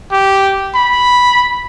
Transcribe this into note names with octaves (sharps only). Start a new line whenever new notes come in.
G4
B5